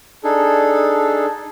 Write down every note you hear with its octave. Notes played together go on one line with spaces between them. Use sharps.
D4 D#4 G#4 A4